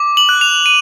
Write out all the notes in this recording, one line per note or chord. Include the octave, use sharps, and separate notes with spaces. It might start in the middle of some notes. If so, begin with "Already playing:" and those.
Already playing: D6
F#7
F#6
F7
D#7